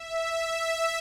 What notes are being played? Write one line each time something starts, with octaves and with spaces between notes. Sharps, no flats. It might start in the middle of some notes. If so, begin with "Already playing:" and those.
Already playing: E5
E5